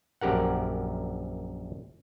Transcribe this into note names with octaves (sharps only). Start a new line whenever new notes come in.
A#1 F#2 G4 A#4 F#5